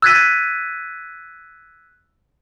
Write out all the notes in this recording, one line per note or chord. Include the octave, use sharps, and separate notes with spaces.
E6 F#6 G#6 A6 B6 D#7